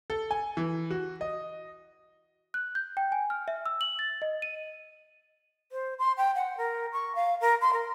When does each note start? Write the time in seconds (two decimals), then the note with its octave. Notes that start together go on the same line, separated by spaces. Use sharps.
0.10 A4
0.31 G#5
0.57 E3
0.91 F#4
1.21 D#5
2.54 F#6
2.75 G6
2.97 G5
3.12 G#5
3.30 F6
3.48 E5
3.66 E6
3.81 F#7
3.99 A6
4.22 D#5
4.42 D#7
5.72 C5
5.99 C6
6.17 G5
6.35 F#5
6.57 A#4
6.93 C#6
7.15 F5
7.41 A#4
7.61 C6
7.73 A#4